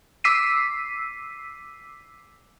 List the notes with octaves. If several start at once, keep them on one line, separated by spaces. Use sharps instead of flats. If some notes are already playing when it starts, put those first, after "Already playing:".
D6 E6 B6 C7 D#7